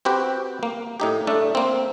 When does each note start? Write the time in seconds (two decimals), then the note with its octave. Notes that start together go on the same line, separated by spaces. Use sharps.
0.05 C4 F#4 G4 B4 G5
0.63 A#3
1.00 A2 D#4 G4
1.27 A3 D4 A4
1.55 A#3 C4